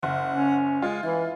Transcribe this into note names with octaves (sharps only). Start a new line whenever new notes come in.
F#1 F#5
C#4
G#3 F4
E3 E4